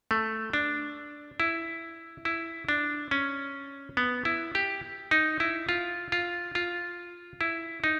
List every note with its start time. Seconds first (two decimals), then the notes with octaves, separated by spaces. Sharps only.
0.11 A3
0.53 D4
1.40 E4
2.25 E4
2.69 D4
3.11 C#4
3.97 B3
4.25 E4
4.55 G4
5.11 D#4
5.40 E4
5.69 F4
6.12 F4
6.55 F4
7.41 E4
7.84 D#4